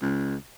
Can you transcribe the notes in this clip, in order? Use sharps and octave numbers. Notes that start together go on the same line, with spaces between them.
C#2